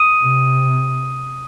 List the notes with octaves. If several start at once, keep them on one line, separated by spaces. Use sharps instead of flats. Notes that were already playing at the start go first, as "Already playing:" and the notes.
Already playing: D#6 D#7
C3